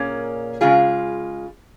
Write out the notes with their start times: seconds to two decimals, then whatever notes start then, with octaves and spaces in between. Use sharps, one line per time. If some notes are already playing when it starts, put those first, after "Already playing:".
Already playing: A#2 A#3 C#4 G#4
0.61 C#3 G#3 F4 G#4